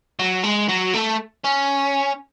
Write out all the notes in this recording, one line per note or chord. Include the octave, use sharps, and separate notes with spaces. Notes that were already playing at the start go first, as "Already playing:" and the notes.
F#3
G#3
F#3
A3
C#4